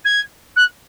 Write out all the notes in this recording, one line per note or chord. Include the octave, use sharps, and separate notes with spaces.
G#6
F#6